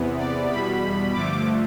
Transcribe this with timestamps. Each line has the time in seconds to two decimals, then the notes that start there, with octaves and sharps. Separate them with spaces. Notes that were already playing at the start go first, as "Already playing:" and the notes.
Already playing: E2 C3 E3 B3
0.18 D5
0.50 E2 B2 G3 B5
1.13 G2 D3 F3 A3 D6